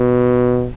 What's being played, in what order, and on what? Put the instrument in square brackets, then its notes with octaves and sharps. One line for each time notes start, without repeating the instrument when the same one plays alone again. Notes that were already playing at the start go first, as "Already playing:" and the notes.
Already playing: [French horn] B2